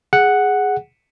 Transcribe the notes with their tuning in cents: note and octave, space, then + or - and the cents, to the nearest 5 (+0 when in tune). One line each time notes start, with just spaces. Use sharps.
G#4 +0 F#5 +0